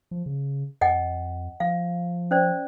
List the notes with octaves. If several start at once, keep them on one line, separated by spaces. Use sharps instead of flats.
F3
C#3
F2 D#5 F#5 G#5
F3 F5
C#4 C5 D5